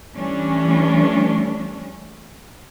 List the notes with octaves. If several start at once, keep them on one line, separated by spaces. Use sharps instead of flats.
E3 G3 A3 C#4 D4